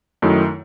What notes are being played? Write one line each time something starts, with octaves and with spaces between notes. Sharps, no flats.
F#2 D#3 A3 E4